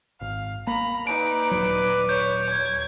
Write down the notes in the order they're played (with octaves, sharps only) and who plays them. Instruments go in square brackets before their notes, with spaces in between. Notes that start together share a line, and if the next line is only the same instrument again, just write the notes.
[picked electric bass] G#1 [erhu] F5
[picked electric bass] A#3 [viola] A#5 [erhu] B5
[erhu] D#4 [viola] B4 D5 [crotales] D7
[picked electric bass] D#1 F#3
[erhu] C#5 [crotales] G6
[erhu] G#6